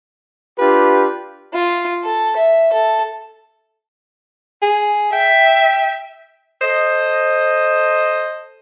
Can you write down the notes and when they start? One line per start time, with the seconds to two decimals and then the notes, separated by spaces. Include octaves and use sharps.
0.59 D4 F4 G4 B4
1.53 F4
2.04 A4
2.36 E5
2.73 A4
4.62 G#4
5.13 E5 G5
6.61 A4 C5 D#5